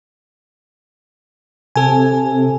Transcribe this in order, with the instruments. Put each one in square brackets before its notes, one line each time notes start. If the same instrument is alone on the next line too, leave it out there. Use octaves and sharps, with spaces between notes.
[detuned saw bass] C3 [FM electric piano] A4 G#5